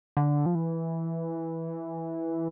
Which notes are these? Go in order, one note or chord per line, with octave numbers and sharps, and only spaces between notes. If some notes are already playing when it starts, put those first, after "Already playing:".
D3
F3
E3